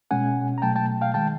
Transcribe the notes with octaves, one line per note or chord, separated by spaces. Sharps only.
B2 G#3 C#4 F#5 G#5
A#5
B2 F#3 A3 G5 A5
G5 A5
F5 G5
D#3 G#3 G5 A5